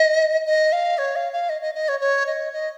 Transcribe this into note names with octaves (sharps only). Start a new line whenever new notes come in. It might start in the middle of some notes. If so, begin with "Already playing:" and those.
Already playing: D#5
D#5
F5
C#5
F5
F5
D#5
D#5
D#5
C#5
C#5
D#5
D#5